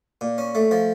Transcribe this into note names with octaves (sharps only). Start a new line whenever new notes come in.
A#2
C#4
A3
F3